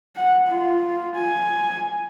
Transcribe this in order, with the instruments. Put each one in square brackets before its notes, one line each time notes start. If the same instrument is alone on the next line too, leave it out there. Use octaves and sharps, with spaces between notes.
[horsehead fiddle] F#5
F4
G#5